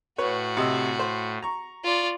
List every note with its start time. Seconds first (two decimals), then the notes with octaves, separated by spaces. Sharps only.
0.18 A2 F#4 B4 C#5
0.57 C3 D#5 E6
0.99 C5
1.42 A#5 C#6
1.84 F4 D5